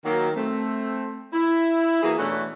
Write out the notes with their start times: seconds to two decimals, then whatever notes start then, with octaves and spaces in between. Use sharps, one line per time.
0.05 D#3 F#3 A#3
0.36 A3 C4
1.33 E4
2.03 E3 A#3 F#4 G#4
2.17 B2 E3 A3 C#4 D4 F#4